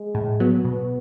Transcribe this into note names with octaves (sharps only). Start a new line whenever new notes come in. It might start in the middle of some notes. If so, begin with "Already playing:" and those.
Already playing: G#3
A2
F#3 B3
B2 B3